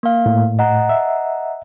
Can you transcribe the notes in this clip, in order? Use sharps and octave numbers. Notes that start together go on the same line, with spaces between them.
A#3 F5
A2
D#5 F#5 A#5
E5